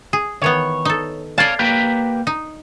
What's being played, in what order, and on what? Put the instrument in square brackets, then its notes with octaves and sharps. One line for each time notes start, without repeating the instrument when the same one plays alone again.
[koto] G#4
[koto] D#3 E3 B3 [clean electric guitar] C#5
[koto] D#4 A4
[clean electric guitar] C#5 F5 [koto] D5 A5
[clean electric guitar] A#3 G4 B4
[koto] D#4